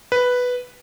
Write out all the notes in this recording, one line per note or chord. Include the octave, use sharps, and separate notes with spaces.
B4